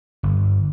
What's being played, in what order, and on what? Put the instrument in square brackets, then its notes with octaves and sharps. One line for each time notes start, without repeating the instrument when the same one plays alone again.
[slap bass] G1